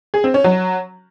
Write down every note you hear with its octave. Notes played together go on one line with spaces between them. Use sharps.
G#4
C4
C#4
F#3